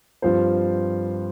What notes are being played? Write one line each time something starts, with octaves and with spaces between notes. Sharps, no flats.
G2 F3 C4 F4 C5